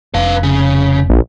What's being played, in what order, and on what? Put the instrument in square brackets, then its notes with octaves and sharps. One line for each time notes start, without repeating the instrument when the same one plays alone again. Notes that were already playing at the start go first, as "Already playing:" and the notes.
[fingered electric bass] F1 [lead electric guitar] B4 F5
[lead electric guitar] C#3
[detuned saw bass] A#1